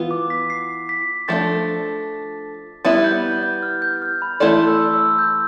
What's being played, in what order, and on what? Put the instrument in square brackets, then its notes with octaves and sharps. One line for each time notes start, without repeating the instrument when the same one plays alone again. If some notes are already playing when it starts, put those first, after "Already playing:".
Already playing: [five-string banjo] E3 B3 F4
[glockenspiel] D6
B6
C7
B6
[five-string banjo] F3 A3 D4 [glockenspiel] A6
[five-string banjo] G3 B3 E4 [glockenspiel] A6
[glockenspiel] G6
G6
F6
G6
F6
B5
[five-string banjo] E3 A3 E4 A4 D5 [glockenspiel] C6
[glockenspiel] E6
E6
G6